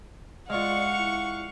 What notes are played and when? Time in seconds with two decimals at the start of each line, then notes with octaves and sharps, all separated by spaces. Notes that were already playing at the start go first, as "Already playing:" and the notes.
0.50 G#3 F4 D5 F5 F#5 C#6
0.97 E4